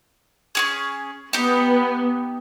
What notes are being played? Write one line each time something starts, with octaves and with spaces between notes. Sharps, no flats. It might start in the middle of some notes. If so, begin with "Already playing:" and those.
C#4 F#4 G#4
B3 D#4 G4